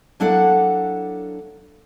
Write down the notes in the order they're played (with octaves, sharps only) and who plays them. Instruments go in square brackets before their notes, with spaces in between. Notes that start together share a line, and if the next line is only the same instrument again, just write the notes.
[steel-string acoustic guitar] F#3 A#3 D4 E4 A4 F#5